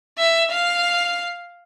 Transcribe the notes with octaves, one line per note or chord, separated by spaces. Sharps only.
E5
F5